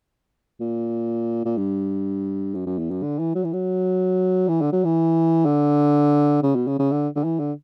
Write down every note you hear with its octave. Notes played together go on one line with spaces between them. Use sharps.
A#2
A#2
G2
F#2
F#2
E2
F#2
D3
E3
F#3
E3
F#3
E3
D3
F#3
E3
D3
C#3
B2
C#3
C#3
D3
D3
E3
D3